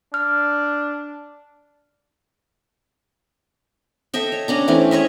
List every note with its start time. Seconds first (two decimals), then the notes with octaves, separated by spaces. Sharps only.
0.14 D4 F6
4.14 A4 D#5 E5 G5
4.32 C#5
4.48 C#4 D4 A#5
4.68 E3 A3 C4 C#4
4.91 G#4 C#5 D#5 E5